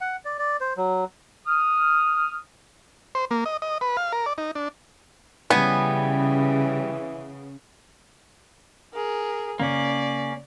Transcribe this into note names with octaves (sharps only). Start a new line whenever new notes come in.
F#5
D5
D5
C5
F#3
D#6 F6
C5
A#3
D#5
D#5
B4
F5
A#4
D5
D#4
D4
C#3 E3 G3 B3 G#5
G#4 A#4
C#3 A#3 C#4 D5